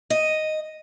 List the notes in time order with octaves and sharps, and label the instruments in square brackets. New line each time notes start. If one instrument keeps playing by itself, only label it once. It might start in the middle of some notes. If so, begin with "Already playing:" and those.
[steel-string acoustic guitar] D#5